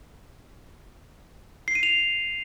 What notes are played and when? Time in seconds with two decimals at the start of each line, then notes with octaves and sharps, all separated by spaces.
1.68 C7
1.75 D#7
1.83 F7